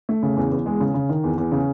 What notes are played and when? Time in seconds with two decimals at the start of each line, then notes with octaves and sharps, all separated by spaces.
0.09 A3
0.23 C#3
0.36 E2
0.52 E2
0.66 G#3
0.80 C#3
0.94 C#3
1.09 D#3
1.24 E2
1.38 E2
1.52 C#3